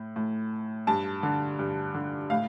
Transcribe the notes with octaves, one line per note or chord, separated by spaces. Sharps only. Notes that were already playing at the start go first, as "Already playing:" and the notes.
Already playing: A2
A2
G2 A5
D3
G2
D3
A2 F5